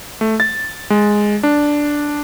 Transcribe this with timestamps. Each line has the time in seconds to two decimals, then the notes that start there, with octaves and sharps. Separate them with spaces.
0.21 A3
0.40 A6
0.90 G#3
1.43 D4